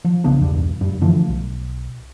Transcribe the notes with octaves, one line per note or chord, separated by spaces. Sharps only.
F3
B1 C#3 B3 D4
B1 E2 G2 G3
F#1 F#2 G3
D3 E3 F3 A3
B1